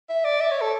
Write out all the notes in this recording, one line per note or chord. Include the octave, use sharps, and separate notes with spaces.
E5
D5
E5
C#5
A4